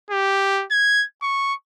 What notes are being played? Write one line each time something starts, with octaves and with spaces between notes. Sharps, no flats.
G4
G#6
C#6